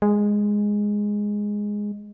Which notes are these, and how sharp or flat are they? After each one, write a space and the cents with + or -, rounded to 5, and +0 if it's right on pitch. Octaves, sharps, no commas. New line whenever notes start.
G#3 -5